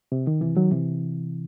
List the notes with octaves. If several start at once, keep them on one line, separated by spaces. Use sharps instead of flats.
C3
D#3
C3 E3
D#3 F#3
C3 E3